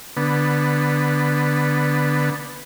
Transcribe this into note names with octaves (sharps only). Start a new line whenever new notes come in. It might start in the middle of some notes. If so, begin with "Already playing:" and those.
D3 B3